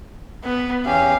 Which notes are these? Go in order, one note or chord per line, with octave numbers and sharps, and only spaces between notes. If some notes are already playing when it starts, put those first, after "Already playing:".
B3
E2 C#4 G4 F5